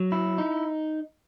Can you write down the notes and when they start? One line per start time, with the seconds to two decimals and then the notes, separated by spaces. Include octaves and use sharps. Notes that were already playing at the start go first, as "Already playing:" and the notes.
Already playing: F#3
0.12 E4
0.38 D#4